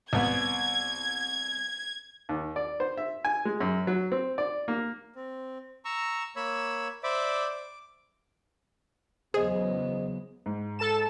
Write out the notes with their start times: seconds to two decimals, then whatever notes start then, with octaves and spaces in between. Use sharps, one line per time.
0.13 C2 B3 G#6
2.29 D#2
2.56 D5
2.80 C5
2.97 E5
3.25 G#5
3.45 G#3
3.61 F#2
3.87 F#3
4.12 C4
4.38 D5
4.68 A#3
5.15 C4
5.85 A#5 C#6 E6
6.36 A#3 C#5 B5 E6
7.03 C5 D5 E5 B5 D6
7.50 D6
9.34 E2 C#3 F#3 G#3 B3 G#4 C5 D#5
10.46 G#2
10.79 A4 A5 E7